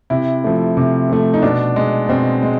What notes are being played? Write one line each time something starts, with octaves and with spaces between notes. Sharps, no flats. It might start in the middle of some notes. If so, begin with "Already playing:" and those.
C3 E4
F3 A3
C3
F3 A3
D#4
B2 D4
G#3
B2 C4
G#3